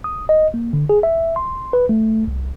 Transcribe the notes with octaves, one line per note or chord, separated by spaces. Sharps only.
D#6
D#5
A#3
D3
G#4
E5
C6
B4
A3
C2